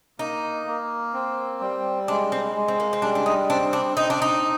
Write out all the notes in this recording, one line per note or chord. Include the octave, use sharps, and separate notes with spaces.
A#3 D#4
A#3
C4
G3
G#3 D4
C4
G#3
C4
A#3
C4
G3 D4
D4
D#4
C4 D4
D4
C4 D#4
D4
D#4